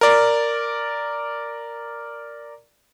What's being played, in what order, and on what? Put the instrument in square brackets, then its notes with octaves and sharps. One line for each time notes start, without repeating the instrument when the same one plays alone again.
[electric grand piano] A#4 D5